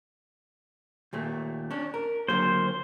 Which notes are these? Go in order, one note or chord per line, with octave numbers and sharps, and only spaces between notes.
D#2 A#2 A3
C#4 D4
A#4
D3 F#3 A#3 C5